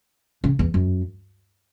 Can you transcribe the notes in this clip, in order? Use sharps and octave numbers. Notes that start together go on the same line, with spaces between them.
C#3
E2
F#2